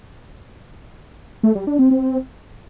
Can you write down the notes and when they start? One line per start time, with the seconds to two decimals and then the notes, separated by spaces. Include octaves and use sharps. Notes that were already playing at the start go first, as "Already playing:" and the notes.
1.43 A3
1.55 G3
1.67 D4
1.79 C4
1.91 C4